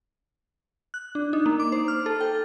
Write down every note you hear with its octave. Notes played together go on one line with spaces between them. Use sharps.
F#6
D4
D#4
A#3
D6
C5
F6
A4
G5